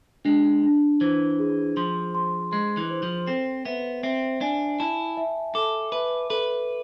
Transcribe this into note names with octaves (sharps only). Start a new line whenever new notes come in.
G#3 D4
D4
E3 C5
G#4
F3 C6
C6
G#3 C6
E3
C5
F3
C4 A4
B3 E5
C4 E5
D4 G#5
E4 A5
E5
A4 D6
B4 E5
A4 B4